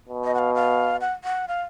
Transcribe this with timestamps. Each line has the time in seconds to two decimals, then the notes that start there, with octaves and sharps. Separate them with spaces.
0.09 B2
0.24 D#5
0.35 F#5
0.39 F5
0.55 F5
1.01 F#5
1.24 F#5
1.48 F5